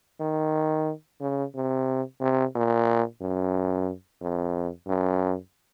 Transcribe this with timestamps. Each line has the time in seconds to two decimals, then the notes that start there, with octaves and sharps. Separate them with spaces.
0.20 D#3
1.21 C#3
1.55 C3
2.21 C3
2.55 A#2
3.21 F#2
4.22 F2
4.88 F#2